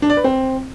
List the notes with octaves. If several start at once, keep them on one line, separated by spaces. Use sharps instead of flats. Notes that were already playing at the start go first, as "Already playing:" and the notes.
D4
D5
B4
C4